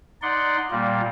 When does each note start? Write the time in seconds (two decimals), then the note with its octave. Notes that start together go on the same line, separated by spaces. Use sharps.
0.22 D#4 D5 F#5 C6
0.71 A#2 G3 A#3